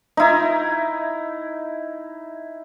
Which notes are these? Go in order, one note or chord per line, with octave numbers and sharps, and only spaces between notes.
D#4 E4